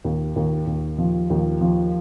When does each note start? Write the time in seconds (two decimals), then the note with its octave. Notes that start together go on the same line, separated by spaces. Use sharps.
0.04 D#2
0.36 D#2
0.67 D#2
0.98 F3
1.30 D#2
1.61 F3